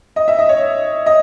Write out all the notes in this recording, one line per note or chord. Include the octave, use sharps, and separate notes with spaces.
D#5
E5
D#5
C#5
D#5